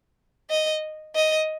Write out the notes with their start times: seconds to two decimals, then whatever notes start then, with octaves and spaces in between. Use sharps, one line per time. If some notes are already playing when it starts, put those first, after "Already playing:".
0.50 D#5
1.15 D#5